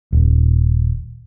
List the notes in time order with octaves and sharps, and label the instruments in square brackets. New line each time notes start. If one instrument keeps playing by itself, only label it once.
[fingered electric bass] D#1